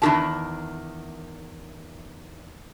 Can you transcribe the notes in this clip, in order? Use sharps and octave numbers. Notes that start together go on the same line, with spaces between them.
E2 D#3 D4 G4 A#4 A5